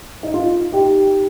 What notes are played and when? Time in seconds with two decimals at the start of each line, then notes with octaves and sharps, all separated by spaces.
0.23 D#4
0.34 F4
0.72 D#4 G4